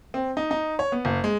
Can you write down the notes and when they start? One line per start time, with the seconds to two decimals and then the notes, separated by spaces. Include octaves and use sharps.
0.14 C4
0.37 D#4
0.51 D#4
0.79 C#5
0.92 B3
1.05 F#1
1.24 G#3